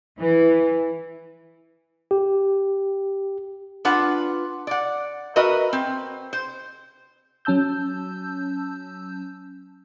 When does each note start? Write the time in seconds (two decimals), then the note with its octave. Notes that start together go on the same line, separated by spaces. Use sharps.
0.19 E3
2.11 G4
3.85 D4 F4 B4 F#5
4.67 D5 F#5
5.36 F#4 A#4 B4 D#5 E5
5.73 C4
6.33 C5
7.45 F#3 C#4 A5 E6 G6